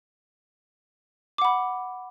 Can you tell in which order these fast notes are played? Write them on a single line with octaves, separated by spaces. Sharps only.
D6 F#5 B5